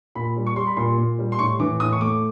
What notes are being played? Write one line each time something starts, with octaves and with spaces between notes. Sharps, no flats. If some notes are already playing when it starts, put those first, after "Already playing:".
A#2 B5
G3
C#6
G3 C6
B5
A#2 C6
A#2
G3
C6
A2 C#6
E3 D6
A2 D#6
C#6
A3 D6